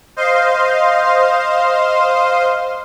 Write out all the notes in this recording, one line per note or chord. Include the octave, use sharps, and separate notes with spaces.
C5 D#5 F5 C6